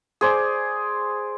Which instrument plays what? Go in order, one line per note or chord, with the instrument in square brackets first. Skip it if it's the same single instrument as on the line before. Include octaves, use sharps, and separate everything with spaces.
[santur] G#4 C5 D5